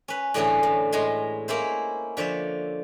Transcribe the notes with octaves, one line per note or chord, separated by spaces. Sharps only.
C#4 B4
A2 D3 E3 C#4 G#4 A4
A2
A2 G#3 G#5 C6
A#3 C#4 E4 C5
D3 F3 C#5 E5